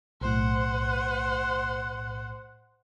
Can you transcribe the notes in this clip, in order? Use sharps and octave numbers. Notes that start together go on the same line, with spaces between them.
B1 A2 C5 F#5